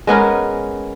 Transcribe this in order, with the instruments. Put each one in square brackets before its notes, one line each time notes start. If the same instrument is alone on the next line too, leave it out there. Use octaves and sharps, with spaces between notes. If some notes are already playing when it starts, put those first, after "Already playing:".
[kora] G#3 B3 C#4 A#4